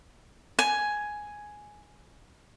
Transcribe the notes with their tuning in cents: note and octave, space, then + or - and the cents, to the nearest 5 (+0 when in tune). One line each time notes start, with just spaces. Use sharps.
G#5 +5